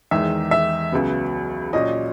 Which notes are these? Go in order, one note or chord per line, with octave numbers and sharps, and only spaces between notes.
E2 D#3 G#3 D#4 E5
E5
C#2 C#3 F#3 B3
A#2 F#3 C#4 D#5